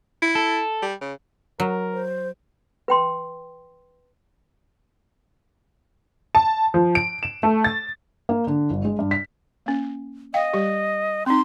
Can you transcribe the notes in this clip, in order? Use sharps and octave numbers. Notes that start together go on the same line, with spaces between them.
E4
A4
G3
C#3
F#3 A#4
C5
B4 G5 C6
A5
F3
D7
E7
A3
A6
A#3
D3
G1
G#3
G2
B6
A#3 C#4
D#5 F5 G5
G3 G4
C4 D#4 C6